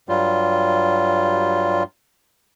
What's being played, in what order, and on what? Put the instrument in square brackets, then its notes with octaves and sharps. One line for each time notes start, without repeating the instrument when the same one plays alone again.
[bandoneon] G2 F#3 G3 F4